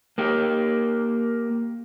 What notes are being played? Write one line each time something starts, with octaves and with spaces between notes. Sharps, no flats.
A#3 G4